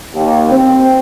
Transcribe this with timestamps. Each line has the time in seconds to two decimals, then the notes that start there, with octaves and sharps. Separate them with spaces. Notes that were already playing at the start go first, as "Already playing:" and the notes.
0.14 D#2
0.50 C4